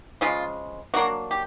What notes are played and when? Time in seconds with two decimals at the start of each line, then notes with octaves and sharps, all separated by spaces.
0.21 C#3 F3 G#3 F4
0.94 F#3 A#3 D4 F#4
1.31 G4